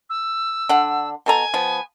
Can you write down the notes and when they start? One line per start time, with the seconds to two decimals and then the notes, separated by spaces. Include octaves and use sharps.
0.09 E6
0.69 D3 F#5
1.26 B2 A4 G#5 A#5
1.54 F3 B3